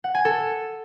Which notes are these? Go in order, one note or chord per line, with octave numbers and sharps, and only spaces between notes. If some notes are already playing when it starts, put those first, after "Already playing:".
F#5
G#5
A4